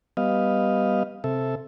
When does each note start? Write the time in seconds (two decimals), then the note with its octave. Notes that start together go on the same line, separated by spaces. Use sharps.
0.17 G3 B3 D#5 F5
1.24 C3 A4 E5